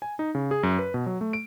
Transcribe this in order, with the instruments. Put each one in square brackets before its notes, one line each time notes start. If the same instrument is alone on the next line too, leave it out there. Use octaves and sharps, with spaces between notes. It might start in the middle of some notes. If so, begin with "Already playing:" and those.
[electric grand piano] G#5
D#4
C#3
G#4
F#2
B4
B2
F#3
A3
D7